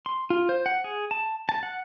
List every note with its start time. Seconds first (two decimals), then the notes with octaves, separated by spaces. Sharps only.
0.06 C6
0.30 F4
0.49 C5
0.66 F#5
0.84 G#4
1.11 A5
1.49 A5
1.63 F#5